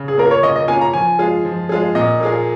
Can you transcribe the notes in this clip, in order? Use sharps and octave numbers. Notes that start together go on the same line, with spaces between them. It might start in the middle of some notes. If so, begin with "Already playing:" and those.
Already playing: C#3
G#4
A#3 C#4 F4 A#4
C#5
C#3 D#5
D#5
A#3 C#4 F4 G#5
A#5
F3 G#5
G#3 F4 G#4
F3
G#3 F4 G#4
A#2 D#5
A#3 F4 G#4